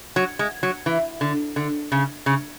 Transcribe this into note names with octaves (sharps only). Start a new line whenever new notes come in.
F#3
G#3
F#3
E3
D3
D3
C#3
C#3